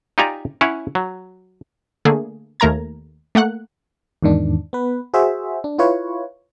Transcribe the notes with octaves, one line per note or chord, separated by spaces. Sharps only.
D#4 F4 G4 D5 G#5 A#5
C#4 E4 C#5 F#5
F#3
D3 A3 A#3 G#4
D#2 A3 A#4 A#5 G#6
A3 A#3 F#5 F#6
E2 G#2 D#3 D4
B3 B4
F#4 G#4 C5 E5
D4
E4 F4 B4 C#5